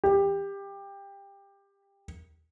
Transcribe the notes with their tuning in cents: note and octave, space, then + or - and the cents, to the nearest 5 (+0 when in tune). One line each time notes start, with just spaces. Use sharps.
G4 +20